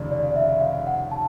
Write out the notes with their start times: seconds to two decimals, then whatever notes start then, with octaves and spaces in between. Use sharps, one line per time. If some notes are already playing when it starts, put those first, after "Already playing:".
Already playing: F1 D#2 C#3 D5
0.11 D5
0.36 E5
0.61 F5
0.87 F#5
1.11 A5